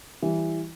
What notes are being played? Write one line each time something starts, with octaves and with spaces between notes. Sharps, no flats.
E3 G3